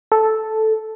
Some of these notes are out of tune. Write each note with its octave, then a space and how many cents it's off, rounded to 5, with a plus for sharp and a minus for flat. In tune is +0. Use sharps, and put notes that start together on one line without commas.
A4 -5